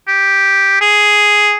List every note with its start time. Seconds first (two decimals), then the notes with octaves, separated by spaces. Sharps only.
0.08 G4
0.81 G#4